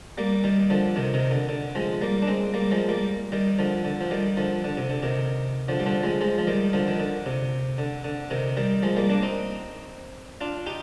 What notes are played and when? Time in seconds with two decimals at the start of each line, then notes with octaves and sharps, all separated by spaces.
0.18 G3 A#3
0.44 D#3 G3
0.70 D3 F3
0.96 C3 D#3
1.14 C3 D#3
1.31 D3
1.49 D3
1.75 F3 G#3
2.01 G3 A#3
2.22 D4
2.27 G#3 C4
2.54 G3 A#3
2.71 F3 G#3
2.89 G3 A#3
3.32 D#3 G3
3.59 D3 F3
3.85 D3
4.01 F3
4.11 D#3 G3
4.37 D3 F3
4.64 D3
4.77 C3
4.89 D3
5.02 C3 D#3
5.68 D3 F3
5.79 G3
5.86 D3 F3
6.03 F3 G#3
6.21 F3 G#3
6.38 F3
6.47 D#3 G3
6.73 D3 F3
6.88 D#3
7.00 D3
7.26 C3
7.78 D3
8.04 D3
8.30 C3 D#3
8.57 D#3 G3
8.83 F3 G#3
8.96 G3 A#3
9.09 A#3 D4
9.22 C4 D#4
10.41 D4 F4
10.66 D#4 G4